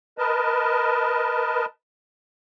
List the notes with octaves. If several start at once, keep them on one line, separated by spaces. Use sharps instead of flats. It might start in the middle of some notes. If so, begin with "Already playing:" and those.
A#4 B4 D#5 A5